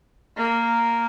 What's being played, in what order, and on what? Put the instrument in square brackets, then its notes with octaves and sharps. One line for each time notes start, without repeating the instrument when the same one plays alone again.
[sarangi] A#3